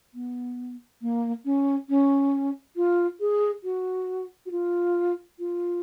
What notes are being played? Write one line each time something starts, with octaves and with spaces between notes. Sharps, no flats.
B3
A#3
C#4
C#4
F4
G#4
F#4
F#4
F4
F4